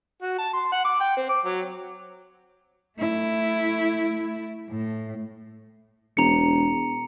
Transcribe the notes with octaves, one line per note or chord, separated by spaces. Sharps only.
F#4
A5
C6
F#5
D6
G5
C4
D6
F#3
A3 E4
A2
E1 A#5 C#7